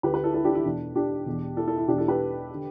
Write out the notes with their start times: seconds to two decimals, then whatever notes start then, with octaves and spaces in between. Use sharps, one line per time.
0.03 D2 D3 G4 B4
0.13 G4 B4
0.24 E4 A4
0.34 E4 A4
0.45 D4 G4
0.55 E4
0.65 E2 B2 D4
0.95 D4 G4
1.26 E2 B2
1.57 E4 A4
1.67 E4 A4
1.78 E4
1.88 E2 B2 D4 G4
1.98 E4 A4
2.08 G4 B4
2.54 D3